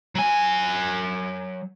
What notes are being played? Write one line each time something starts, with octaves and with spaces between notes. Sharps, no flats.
F#3 G#5